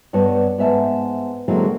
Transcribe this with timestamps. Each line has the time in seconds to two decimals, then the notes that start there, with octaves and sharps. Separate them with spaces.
0.13 G2 B3 C#5 A5
0.58 G#2 B3 E5 A5
1.48 D3 F#3 G#3 A#3 C4 E4